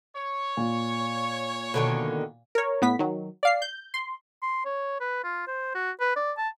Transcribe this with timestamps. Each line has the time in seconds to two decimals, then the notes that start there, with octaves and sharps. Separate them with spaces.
0.16 C#5
0.57 A#2
1.74 B2 D3 D#3
2.55 A#4 C#5
2.82 A2 B3 B6
2.99 D#3 F#3
3.43 D5 F5 C7
3.62 G6
3.94 C6
4.42 C6
4.65 C#5
5.00 B4
5.24 F4
5.47 C5
5.75 F#4
6.00 B4
6.16 D5
6.37 A5